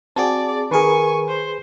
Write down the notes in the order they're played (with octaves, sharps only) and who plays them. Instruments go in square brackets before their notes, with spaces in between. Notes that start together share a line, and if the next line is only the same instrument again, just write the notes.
[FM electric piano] C4 F#4 G#4 [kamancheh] D5 [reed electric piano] A5
[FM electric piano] D#3 A#4 [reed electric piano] G#4 B4 [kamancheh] G#5 C#6
[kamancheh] C5